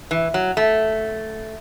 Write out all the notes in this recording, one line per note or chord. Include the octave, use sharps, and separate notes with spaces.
E3
F#3
A3